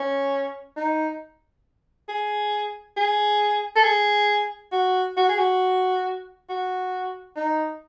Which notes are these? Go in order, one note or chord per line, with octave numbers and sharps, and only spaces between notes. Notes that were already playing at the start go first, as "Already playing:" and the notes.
Already playing: C#4
D#4
G#4
G#4
A4
G#4
F#4
F#4
G#4
F#4
F#4
D#4